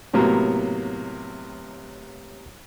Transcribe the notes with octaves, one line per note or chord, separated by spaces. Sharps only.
A2 C3 F#3 A#3 B3